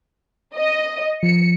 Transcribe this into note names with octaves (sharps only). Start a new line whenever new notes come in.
D#5
F3 C#7